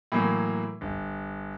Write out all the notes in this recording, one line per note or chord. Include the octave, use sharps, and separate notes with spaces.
A2 E3 F#3 A#3
G1